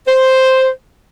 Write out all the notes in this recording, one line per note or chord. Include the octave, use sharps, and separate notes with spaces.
C5